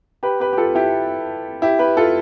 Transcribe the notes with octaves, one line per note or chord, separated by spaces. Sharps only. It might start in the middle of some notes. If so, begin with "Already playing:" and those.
G4 B4
G4 B4
G4
F4 A4
E4 G4
E4 G4
G4 B4
F4 A4